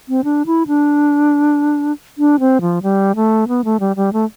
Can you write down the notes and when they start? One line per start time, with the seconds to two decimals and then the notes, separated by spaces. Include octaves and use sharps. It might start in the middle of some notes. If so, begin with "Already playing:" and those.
0.09 C4
0.24 D4
0.46 E4
0.67 D4
2.18 D4
2.40 C4
2.61 F3
2.83 G3
3.15 A3
3.48 B3
3.64 A3
3.80 G3
3.96 G3
4.13 A3